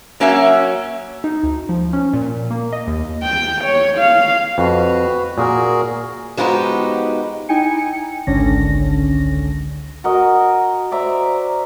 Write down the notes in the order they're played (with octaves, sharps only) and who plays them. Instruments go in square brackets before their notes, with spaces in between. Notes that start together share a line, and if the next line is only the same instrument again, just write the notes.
[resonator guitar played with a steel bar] F#3 A#3 C#4 F#4 C#5 E5
[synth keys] D#4
D2
F3
C#4
A#2
A#3
D#5
D#2
[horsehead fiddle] G5
C#5
F5
[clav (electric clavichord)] F2 [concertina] F#4 B4
[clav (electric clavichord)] A#2 [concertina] F#4 G#4 A#4
[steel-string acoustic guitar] F3 G#3 B3 D#4 F#4 G4
[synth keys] D#4 E4 G5 G#5 C#7
G#1 C#2 D3 C#4 D4 A#6
[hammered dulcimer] F#4 A#4 D#5
C5 D5 E5 A#5